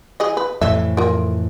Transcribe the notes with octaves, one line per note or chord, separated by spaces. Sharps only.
E3 G#4 D#5
B4
F2 A2 E3 E5
F4 A#4